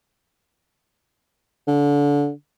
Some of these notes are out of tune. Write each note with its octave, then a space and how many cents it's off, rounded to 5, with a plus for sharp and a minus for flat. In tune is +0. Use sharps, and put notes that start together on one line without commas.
D3 -25